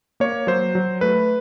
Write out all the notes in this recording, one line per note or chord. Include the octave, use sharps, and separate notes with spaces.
A#3 C#5
F#3 C5
F#3
A3 B4